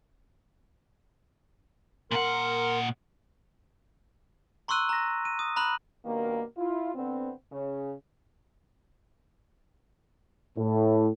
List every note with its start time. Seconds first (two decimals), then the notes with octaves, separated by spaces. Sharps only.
2.11 A#2 A#4 F#5 C6
4.68 A#5 C6 C#6 E6 F#6 D#7
4.89 A#5 A#6
5.25 D#7
5.39 D#6
5.56 A#5 B5 F#6 F#7
6.05 G2 B2 D#3 A#3
6.57 E4 F4
6.95 D3 B3 C4
7.52 C#3
10.57 A2